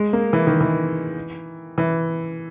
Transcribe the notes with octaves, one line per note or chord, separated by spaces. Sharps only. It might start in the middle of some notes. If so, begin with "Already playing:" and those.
Already playing: G#3
A#3
E3
D#3
E3
E3